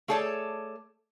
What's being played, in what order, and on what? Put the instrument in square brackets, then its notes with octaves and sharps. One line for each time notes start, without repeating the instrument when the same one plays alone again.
[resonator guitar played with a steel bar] A3 G#4 A4 C#5 D5